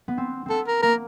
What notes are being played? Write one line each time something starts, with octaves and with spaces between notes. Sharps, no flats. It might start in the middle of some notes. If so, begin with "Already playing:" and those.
B3
C4
B3 C4 A4
A#4
A#3 A#4